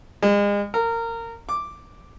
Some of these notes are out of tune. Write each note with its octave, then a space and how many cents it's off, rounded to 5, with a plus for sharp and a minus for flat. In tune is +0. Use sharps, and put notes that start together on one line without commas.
G#3 -35
A#4 -20
D6 +0